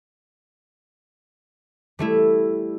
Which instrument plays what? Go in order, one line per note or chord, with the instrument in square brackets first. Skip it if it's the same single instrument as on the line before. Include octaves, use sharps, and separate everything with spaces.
[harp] G3 A3 E4